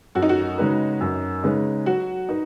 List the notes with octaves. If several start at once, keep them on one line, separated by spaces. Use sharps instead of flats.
F#2 F#4
D#4
F#4
C#3 G#3 D#4 B4
F#2
C#3 G#3 D#4 B4
F#3 F#4
D#4 B4